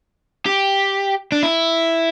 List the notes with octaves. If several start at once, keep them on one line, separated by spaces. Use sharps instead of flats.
G4
D4
E4